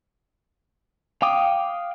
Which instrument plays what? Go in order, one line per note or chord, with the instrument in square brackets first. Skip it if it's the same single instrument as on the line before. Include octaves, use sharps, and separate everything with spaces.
[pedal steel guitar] F5 G5 D6 D#6